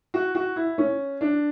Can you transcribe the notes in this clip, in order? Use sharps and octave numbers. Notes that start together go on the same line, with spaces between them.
F#4
F#4
E4
C#4
D4